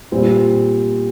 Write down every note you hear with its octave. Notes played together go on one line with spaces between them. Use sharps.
A#2 G3 C4 F4